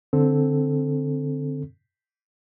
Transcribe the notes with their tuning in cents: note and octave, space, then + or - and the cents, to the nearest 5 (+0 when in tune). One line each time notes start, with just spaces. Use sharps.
D3 +0 C4 +0 A4 +0